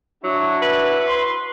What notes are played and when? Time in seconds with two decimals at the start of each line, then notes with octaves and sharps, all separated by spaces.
0.24 F#3 D4 E4 F#4
0.62 B4
1.07 C6